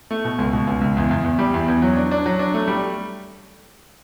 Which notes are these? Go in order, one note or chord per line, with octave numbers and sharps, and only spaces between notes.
A3
B2
C#2
B2
C#2
C#2
E2
E2
E2
G3
E2
E2
F#3
D4
D4
F#3
D4
A3
G3